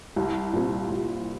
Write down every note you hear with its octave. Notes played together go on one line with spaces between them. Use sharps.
C2
A#2 G3 C4
C2